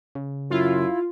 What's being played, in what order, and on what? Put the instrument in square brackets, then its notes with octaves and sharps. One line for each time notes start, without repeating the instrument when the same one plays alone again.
[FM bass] C#3
[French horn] F#2 [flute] E4 [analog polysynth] F4